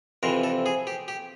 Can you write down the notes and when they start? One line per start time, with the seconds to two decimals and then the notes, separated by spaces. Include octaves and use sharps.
0.23 F2 C3 E3 A#4
0.44 A4
0.66 G#4
0.87 G4
1.08 G4